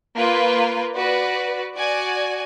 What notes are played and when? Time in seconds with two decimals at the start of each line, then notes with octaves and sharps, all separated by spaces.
0.15 A#3 F4 B4
0.96 F#4 B4 D5
1.75 F#4 D5 G#5